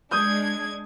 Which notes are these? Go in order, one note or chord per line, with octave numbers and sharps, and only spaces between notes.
G#3 D4 D#6 G6 G#6